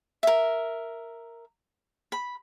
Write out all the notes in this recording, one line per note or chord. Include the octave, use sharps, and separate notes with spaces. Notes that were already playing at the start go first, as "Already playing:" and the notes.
A#4 E5
B5